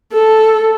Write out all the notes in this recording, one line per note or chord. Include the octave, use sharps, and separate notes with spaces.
A4